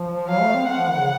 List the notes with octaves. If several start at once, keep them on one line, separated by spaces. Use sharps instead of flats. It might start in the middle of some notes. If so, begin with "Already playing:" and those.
Already playing: F3
F#3 F5
A3
C4
C4 F#5
F3
D#3
C#3